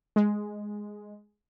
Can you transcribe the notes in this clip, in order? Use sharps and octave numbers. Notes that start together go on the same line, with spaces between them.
G#3